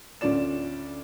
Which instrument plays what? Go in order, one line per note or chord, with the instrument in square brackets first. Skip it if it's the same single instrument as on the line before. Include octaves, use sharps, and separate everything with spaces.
[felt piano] D2 C#4 F4 D5 E7